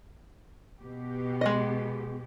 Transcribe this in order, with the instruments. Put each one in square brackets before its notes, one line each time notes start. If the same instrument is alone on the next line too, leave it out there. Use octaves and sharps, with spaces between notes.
[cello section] B2 G4
[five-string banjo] G#3 D#5